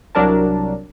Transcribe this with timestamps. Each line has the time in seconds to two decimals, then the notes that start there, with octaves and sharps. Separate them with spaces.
0.15 C2 F#3 D4 A#4 A5